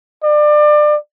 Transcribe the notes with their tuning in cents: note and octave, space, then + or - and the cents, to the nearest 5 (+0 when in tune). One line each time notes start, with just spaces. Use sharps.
D5 +25